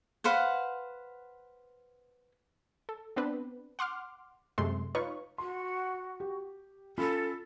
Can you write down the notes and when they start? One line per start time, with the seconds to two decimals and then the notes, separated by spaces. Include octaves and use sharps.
0.24 B4 C5 F5 F#5
2.89 A4
3.16 B3 C4 D4 B4
3.79 F#5 C6 D6 F6
4.58 F#2 C3 G#3 A3 C6
4.95 D#4 F4 B4 C#5 C#6
5.38 F#4 C6
6.20 G4
6.98 C#4 F4 A4 B5